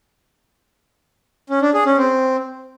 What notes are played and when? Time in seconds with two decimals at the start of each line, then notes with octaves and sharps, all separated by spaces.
1.50 C#4
1.62 D4
1.74 G#4
1.86 C#4
1.98 C4